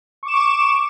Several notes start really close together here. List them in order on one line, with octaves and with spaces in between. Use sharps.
C#6 D6 E7